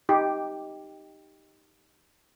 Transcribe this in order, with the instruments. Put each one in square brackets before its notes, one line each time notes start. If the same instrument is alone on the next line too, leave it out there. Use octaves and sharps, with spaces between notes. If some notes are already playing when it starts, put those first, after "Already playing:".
[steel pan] D#4 G4